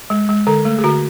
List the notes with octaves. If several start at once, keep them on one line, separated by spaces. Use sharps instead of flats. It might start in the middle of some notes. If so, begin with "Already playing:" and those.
G#3
G#3
D3 A4
A3
G#4
D3 F#4